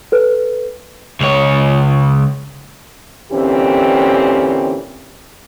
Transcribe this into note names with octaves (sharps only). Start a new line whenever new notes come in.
A4 B4
C#2 C#5
A#2 D3 E3 C4 C#4 G4